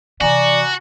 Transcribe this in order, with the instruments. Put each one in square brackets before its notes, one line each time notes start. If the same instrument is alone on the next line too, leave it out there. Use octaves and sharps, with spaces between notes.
[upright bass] C3 E3 [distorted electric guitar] F#4 [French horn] D5 [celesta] G#5 A#5 D6